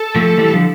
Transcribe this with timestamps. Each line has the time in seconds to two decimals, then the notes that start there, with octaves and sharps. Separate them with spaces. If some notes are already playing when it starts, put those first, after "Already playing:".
Already playing: A4
0.16 F3 A3
0.38 E3 G3
0.54 D3 F3